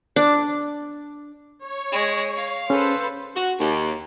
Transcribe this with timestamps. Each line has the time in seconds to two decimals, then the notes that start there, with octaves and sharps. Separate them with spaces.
0.16 D4
1.63 C#5
1.92 G#3
2.36 F5
2.70 C#4 G#4 A4 B4 C5
3.36 F#4
3.60 D#2